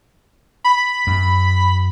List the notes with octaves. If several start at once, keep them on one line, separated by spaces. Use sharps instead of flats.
B5
F#2